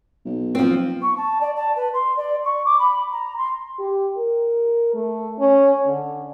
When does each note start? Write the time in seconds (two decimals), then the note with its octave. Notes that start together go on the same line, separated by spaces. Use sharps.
0.25 B1
0.55 F3 C4
1.01 C#6
1.17 A5
1.40 D5
1.56 A5
1.75 B4
1.93 C6
2.16 D5
2.44 C#6
2.65 D6
2.79 B5
3.12 A#5
3.37 C6
3.79 G4
4.18 A#4
4.94 A3
5.39 C#4
5.87 D3